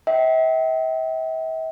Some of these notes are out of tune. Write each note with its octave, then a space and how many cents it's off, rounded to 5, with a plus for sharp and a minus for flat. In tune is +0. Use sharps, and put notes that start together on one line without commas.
E5 -40 G5 -30